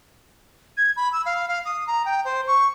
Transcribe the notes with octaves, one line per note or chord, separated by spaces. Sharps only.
G#6
B5
E6
F5
F5
D#6
A#5
G5
C5
C#6